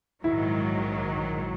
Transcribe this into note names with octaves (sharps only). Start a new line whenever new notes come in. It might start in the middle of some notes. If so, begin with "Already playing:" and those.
A#1 G#2 D#3 F#3 E4